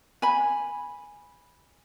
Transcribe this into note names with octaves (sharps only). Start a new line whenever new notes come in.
G#5 B5